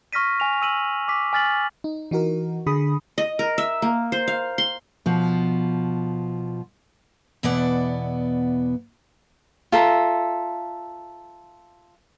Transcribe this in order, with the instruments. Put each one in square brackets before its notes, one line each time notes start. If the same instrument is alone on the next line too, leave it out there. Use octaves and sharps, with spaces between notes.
[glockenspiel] C#6 F6 A#6 B6 D#7
G#5 F7
E6 D#7 F#7
D6 B6
G#5 F6 A6 B6 F#7
[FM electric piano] D#4
E3 D#4 F#4 A#4
D3 G#4 B5 D#6
[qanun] D#5
A#4
E5
A#3
C5
F5
C6
[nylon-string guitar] B2 F3
[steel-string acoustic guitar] E2 B2 B3 E4 D5 F#5
[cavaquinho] F4 A4 E5 A#5